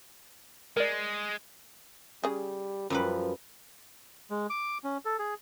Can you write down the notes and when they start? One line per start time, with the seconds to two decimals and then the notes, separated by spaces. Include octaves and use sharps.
0.77 G#3 A#4 D5
2.24 C#3 G3 G#4
2.90 F#2 F3 G3 B4
4.30 G#3
4.50 D6
4.84 C#4
5.05 A4
5.19 G#4